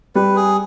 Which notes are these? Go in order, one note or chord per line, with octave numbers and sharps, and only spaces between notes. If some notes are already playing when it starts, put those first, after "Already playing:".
G3 B4
G#4